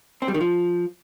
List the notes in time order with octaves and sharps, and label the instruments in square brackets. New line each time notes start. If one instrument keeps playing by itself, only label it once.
[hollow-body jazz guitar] C4
G3
D#3
F3